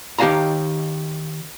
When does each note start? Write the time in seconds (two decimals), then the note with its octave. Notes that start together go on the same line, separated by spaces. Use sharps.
0.19 D#3 G4 E5 F5 A5 A#5